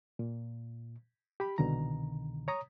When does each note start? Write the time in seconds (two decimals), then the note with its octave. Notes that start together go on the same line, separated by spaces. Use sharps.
0.19 A#2
1.40 G4 B5
1.58 C2 B2 D3 D#3 A#5
2.48 C#5 A#5 D#6